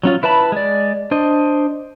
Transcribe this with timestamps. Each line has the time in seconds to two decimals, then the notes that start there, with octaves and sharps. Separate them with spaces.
0.03 F#3 C#4 F4
0.23 E4 B4 E5 A5 B5
0.52 G#3 D5
1.11 D4 C5 D#5